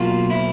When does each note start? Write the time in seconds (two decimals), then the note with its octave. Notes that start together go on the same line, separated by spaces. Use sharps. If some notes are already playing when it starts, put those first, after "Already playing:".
Already playing: B2 F#3 A#3 F4
0.30 E4